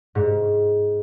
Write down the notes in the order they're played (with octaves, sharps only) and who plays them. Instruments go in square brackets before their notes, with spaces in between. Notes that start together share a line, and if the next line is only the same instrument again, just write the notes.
[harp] G#2